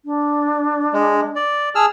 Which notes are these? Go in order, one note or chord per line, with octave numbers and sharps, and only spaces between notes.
D4
G#3
D5
G#4 A5 E6 F6